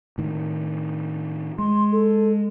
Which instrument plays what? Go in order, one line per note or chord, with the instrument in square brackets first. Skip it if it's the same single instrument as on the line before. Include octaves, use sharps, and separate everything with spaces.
[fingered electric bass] A2 D#3
[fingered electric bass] G#3 [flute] C6
[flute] A4